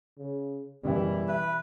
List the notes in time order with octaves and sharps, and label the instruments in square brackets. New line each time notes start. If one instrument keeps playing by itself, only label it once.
[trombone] C#3
[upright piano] F#1 G4 [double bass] B2 E3 [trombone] G3
[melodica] B4 [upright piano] E5